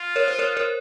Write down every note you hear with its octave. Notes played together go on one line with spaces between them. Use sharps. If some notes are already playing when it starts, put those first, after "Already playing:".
Already playing: F4
A#4 C#5
C5
A#4 C#5
A#4 C#5